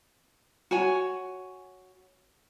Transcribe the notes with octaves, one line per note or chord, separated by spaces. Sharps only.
F#4 C#5 G#5